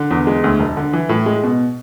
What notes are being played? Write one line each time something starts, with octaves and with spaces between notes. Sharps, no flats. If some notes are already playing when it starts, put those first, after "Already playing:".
Already playing: D3
E2
G#3
D2
E1
D3
E3
A2
G#3
B2